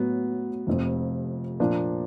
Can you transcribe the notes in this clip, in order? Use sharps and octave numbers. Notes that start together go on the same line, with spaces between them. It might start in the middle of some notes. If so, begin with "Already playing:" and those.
Already playing: A2 F#3 B3
F1 F2 C3
A#2 F3 A#3 D4